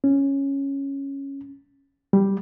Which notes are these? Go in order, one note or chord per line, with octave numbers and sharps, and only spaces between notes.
C#4
G3